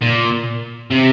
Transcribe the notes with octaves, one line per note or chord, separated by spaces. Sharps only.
A#2
C3